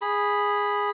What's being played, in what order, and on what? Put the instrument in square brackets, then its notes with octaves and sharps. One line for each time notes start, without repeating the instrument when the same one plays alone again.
[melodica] G#4 B5